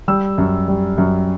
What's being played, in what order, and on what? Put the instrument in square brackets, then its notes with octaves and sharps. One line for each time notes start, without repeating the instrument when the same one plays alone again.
[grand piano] G3 E6
F#2
G3
F#2